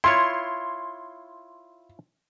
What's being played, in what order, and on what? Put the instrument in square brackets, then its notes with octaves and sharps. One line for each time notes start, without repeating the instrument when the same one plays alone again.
[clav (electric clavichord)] E4 F4 C#5 [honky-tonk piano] C6